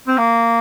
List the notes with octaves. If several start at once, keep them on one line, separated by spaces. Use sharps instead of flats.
C4
A#3